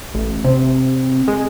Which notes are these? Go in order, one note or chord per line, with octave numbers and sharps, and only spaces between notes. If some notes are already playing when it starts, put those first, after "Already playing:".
A1
C3
G#3